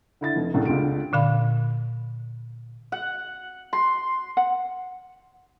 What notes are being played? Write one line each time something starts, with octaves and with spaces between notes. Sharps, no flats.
D3 E4 A6
F1
C2 A2 C#3
C#2 D3 F4 G4 D7
A#2 D3 F5 B5
F#5
C6
F#5